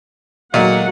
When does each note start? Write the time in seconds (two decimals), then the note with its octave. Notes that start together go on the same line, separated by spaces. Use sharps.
0.54 A#2 D#3 F#3 G#3 A3 F#5